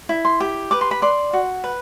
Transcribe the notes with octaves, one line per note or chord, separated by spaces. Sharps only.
E4
C6
G4
B4 D6
C6
B5
D5 C6
F#4
B4